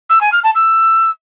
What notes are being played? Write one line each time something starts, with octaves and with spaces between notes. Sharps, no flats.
E6
G#5
F6
A5
E6